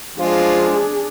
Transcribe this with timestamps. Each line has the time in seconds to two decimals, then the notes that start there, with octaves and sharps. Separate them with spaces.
0.20 F3 G#3 D4 F4 G#4 F5